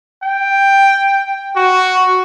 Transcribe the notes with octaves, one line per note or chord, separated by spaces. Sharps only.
G5
F#4